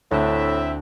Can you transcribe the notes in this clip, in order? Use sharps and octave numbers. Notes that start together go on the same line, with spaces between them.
D2 A2 C4 E4 E5 F#6 E7